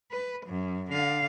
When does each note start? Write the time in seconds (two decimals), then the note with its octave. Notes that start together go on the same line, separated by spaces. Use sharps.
0.11 B4
0.46 F#2
0.91 D3 F5